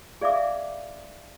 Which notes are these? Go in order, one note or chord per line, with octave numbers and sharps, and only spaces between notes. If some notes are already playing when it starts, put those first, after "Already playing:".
G#4 D5 E5 F5 D6